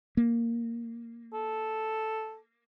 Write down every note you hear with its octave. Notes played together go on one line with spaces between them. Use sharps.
A#3
A4